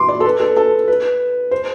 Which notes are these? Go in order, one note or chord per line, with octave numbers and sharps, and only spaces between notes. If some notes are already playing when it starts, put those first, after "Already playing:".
Already playing: C6 D6
D5
A4
B4
A4
A4
B4
C5